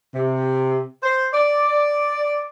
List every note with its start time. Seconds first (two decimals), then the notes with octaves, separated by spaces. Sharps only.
0.14 C3
1.03 C5
1.33 D5